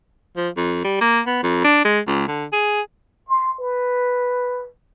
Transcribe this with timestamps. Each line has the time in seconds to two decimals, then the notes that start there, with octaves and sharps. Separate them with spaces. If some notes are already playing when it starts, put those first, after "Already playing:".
0.36 F3
0.56 F2
0.84 G3
1.01 A#3
1.27 B3
1.43 F2
1.64 D4
1.85 G#3
2.07 C#2
2.28 D3
2.53 G#4
3.28 C6
3.59 B4